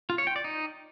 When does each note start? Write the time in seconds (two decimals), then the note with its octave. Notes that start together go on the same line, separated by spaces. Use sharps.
0.10 F4
0.18 C#5
0.27 G5
0.36 D5
0.44 D#4